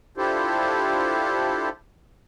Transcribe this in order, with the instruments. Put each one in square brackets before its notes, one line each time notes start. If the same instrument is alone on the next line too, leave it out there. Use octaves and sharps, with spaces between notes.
[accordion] D4 E4 F4 G4 A4 C5